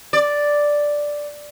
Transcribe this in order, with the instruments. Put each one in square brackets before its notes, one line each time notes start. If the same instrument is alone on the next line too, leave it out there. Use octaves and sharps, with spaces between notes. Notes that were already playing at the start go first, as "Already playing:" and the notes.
[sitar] D5